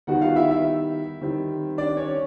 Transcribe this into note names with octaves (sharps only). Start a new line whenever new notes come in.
D#3 G3 B3 D#4 F#4 F#5
F4 F5
E4 E5
E4 E5
D#3 G3 C4 E4
D4 D5
C#4 C#5